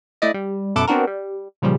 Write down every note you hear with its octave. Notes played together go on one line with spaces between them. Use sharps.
A3 E4 D5 D#5
G3
F#2 B2 E4 A4 F#5 D6
B3 C4 D4 F#4 A#4
G3
A#2 C#3 F3 G3